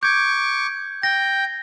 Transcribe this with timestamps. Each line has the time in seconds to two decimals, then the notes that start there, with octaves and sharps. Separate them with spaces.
0.03 C#6 D6 G6 G#6
1.03 G5 A#6